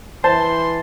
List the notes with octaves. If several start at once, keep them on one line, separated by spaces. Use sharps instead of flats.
E3 C5 A5 C6